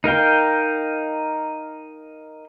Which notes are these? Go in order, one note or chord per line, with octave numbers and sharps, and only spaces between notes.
D#4 A#4 F5 G5